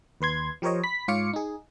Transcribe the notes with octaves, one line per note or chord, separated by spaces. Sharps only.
D#2 B4 C6 G#6
F3 G4 A#4 C5 C#5 D#5
B5 B6
G#2 F4 C#5 F5 D6 C#7
D#4 G#4